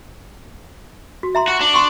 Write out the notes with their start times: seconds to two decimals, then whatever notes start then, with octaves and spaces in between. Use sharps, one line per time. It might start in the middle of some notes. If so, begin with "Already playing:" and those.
1.23 F#4
1.35 E5 A#5 C6
1.48 F#4
1.61 D4
1.74 C6 C#6